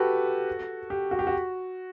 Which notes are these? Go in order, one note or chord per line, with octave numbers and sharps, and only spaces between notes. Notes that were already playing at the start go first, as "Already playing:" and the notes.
Already playing: F#4 G4 A4 B4
G4
F#4
G4
F#4